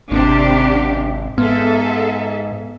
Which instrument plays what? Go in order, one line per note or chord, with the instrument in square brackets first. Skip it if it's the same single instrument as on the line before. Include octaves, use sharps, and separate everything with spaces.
[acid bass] G#1 [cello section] C3 D4 G4
[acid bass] G#2 [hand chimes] B3 [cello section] G#4 A4 E5